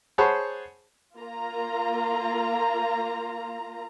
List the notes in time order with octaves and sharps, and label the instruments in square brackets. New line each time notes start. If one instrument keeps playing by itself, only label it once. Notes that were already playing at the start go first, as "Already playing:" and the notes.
[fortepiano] G#4 C5 C#5 F#5 A5 B5
[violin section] A#3 F4 A#5